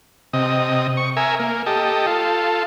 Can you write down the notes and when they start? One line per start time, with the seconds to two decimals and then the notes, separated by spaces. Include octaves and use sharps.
0.33 C3 D#5
0.97 C#6
1.17 A#4 E5 G#5
1.39 A#3
1.66 G4 A4 D#5
2.07 F4 A4